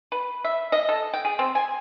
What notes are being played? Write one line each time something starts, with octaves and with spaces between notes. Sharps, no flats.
B4
E5
D#5
A4
G5
G#4
C4
G#5